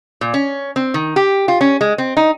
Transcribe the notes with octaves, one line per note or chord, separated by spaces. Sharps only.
A#2
C#4
C4
D#3
G4
F4
C#4
G#3
C4
D#4